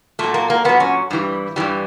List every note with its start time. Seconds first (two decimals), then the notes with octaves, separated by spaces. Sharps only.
0.19 A#2 F#3 A3
0.34 A#3
0.50 A#3
0.65 A#2 F#3 B3
0.80 C#4
1.10 G2 E3 G3
1.56 G2 E3 G3